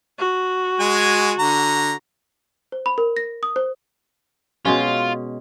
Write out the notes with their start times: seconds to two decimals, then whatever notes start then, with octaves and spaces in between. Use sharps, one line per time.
0.19 F#4
0.80 G#3 G#5
1.39 D3 A#5
2.72 C5
2.86 B5
2.98 A#4
3.17 A#6
3.43 D#6
3.56 C5
4.65 B2 G#3 C#4 F4